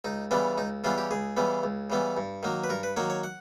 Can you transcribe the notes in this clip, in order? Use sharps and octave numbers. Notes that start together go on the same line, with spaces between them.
C#2 D#4
C#3 E3 G3 B3 D4
C#2 D#4
C#3 E3 G3 B3 F4
G4
C#2 G#4
C#3 E3 G3 B3
C#2
C#3 E3 G3 B3
G2
D#3 F#3 A#3
B4
G2 A#4
B4
D#3 F#3 A#3 C#5
C#5
F#5